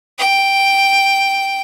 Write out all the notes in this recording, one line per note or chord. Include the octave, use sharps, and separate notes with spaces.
G5